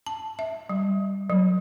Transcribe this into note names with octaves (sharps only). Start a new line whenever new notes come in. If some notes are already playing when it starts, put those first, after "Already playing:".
A5
E5
G3
F#3